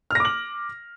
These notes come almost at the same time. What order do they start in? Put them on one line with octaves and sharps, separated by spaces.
F6 A#6 D6 F#7